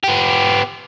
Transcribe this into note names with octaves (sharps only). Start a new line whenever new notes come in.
B3 G4